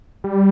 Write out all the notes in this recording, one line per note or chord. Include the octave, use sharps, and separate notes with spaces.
G3